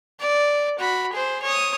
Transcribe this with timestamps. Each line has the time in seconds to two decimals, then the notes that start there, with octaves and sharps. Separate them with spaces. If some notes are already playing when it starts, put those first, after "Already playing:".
0.20 D5
0.79 F#4 B5
1.13 G#4 C5
1.43 C#5 D#6